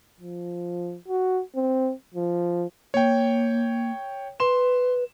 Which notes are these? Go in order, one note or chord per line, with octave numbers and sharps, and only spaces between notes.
F3
F#4
C4
F3
A#3 C#5 G5
B4 C6 E7